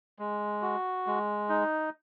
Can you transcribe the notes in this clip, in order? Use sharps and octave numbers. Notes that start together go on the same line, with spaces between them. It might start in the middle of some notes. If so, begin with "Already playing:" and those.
G#3
F#4
G#3
D#4